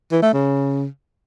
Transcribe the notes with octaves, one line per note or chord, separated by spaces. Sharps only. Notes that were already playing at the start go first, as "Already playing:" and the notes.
E3
A3
C#3